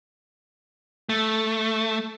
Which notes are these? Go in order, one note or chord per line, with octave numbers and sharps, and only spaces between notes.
A3